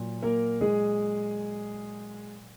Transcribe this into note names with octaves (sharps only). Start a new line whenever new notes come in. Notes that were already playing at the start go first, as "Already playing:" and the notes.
Already playing: A#2 F#3
A#3 A#4
G#3 G#4